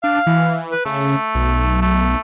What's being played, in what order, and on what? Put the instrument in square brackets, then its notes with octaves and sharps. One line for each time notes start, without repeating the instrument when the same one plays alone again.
[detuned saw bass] D4 [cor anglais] F5
[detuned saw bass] E3
[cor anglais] B4
[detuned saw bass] C#3 [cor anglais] A3
[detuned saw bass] B1
[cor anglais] A3